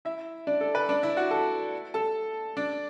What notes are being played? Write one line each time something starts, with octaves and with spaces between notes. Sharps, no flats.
E4 E5
D4 D5
A4
B4
D4 D5
E4 E5
F#4 F#5
A4 A5
A4 A5
D4 D5